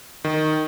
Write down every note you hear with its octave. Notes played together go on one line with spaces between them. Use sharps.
D#3